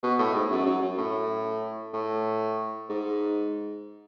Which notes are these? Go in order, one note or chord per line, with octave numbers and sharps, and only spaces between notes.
B2
A2
G#2
F#2
F#2
F#2
A2
A2
G#2